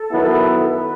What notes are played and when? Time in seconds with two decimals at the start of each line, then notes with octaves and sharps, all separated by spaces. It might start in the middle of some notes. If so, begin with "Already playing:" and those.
Already playing: A4
0.11 F#2 D#3 F#3 B3 E4
0.67 B4